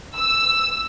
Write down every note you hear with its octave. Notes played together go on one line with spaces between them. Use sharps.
E6